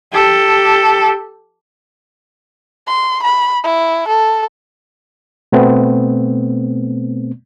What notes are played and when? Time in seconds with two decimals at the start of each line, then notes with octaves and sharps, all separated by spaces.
0.12 G4 A4
2.87 C6
3.23 B5
3.63 E4
4.08 A4
5.52 B2 A3 B3 C4